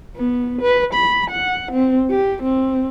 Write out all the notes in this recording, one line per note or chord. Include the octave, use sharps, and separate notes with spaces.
B3
B4
B5
F#5
C4
G4
C4